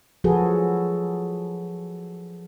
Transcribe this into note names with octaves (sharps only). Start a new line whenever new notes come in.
F3 F#3 F#4 G#4 A4 B4